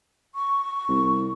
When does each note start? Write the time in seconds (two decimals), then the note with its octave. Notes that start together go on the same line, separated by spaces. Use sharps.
0.35 C#6
0.89 C2